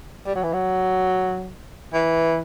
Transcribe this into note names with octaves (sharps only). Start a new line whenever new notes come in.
G3
F#3
E3
F#3
E3